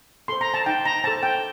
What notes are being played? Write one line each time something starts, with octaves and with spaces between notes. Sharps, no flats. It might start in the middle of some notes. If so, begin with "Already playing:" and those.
A4 C5 C6
A#5
A5
D#4 G5
A#5
A4 C5 A5
G5